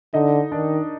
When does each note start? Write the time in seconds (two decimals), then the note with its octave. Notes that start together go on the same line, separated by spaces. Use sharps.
0.14 D3 D#4 D#5
0.52 D#3 D4 D5